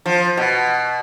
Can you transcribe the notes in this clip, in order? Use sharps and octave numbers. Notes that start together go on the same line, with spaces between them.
F3
B2